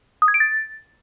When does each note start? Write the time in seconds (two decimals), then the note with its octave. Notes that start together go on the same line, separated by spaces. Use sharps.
0.22 D#6
0.28 G#6
0.34 D7
0.40 A6